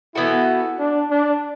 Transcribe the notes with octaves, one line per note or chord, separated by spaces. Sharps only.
E3 B3 E4 F#4 A4
D4
D4